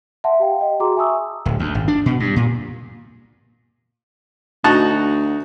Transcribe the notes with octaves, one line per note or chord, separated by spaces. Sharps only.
E5 F#5 A5 C6
G4 F5 G5
D#5 G5
F#4 G#4 A#5 C6 D6
E5 G#5 A5 C#6 D#6 E6
D1
D2
G#1
D4
B2
G2
A#2
D2 D#4 F#4 A5